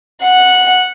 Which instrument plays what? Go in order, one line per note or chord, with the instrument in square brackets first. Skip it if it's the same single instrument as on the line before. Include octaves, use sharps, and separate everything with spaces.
[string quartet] F#5